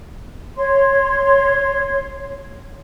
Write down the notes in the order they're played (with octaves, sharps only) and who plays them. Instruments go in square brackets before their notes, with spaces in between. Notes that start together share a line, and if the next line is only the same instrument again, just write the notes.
[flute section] C#5 C6